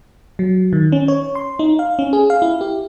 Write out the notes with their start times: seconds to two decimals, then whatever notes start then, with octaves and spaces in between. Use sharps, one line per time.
0.39 F#3
0.73 D#3
0.92 C#4
1.08 C#5
1.35 C6
1.59 D#4
1.79 F5
1.99 C#4
2.13 G#4
2.30 F5
2.42 E4
2.61 G4